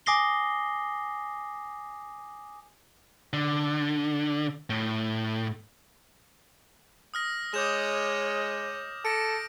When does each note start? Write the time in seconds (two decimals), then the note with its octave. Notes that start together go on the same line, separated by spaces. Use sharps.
0.06 G#5 D6 D#6 A#6 C7 G7
3.33 D3
4.70 A2
7.14 D#6 F6 A#6
7.54 G#3 C#5 D#5 D6 G6 E7
9.05 A4 A#6 C#7 D7